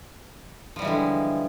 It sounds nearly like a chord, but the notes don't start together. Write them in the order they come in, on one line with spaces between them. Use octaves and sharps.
F3 G3 E3 G#3 D3